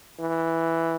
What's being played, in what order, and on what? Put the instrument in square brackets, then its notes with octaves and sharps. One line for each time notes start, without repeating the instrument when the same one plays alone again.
[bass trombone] E3